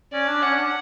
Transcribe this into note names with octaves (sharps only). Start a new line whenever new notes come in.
C#4 D5
D4
C#4 F#5
D4